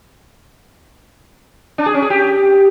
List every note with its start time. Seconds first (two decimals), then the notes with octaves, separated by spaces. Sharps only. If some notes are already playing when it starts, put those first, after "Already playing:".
1.78 D4
1.86 G#4
1.94 C#4
2.02 G#4
2.10 G4